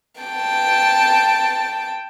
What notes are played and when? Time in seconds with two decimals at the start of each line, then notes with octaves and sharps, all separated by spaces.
0.21 G5 A5